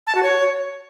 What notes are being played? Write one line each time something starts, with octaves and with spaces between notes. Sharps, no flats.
A5
F#4
C#5